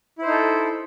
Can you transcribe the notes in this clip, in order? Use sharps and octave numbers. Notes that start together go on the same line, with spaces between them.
D#4 E4 A4 C5